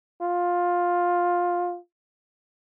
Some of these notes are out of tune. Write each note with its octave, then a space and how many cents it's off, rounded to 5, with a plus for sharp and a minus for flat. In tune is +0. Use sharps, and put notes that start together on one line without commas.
F4 +15